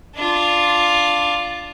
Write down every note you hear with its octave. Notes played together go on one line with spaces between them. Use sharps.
D4 F4